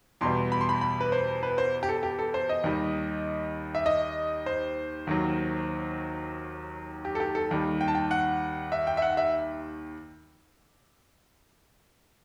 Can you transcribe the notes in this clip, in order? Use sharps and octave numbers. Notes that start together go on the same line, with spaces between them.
E2 B2 G3 C6
B5
C6
B5
B5
B4
C5
B4
C5
G4
A4
G4
A4
C5
D#5
D#2 D#3 G3
E5
D#5
C5
D#2 D#3 F#3
G4
A4
G4
A4
D#2 D#3 G3
G5
A5
G5
F#5
E5
G5
E5
F#5
E5